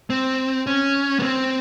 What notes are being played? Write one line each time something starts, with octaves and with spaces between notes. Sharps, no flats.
C4
C#4
B3
C4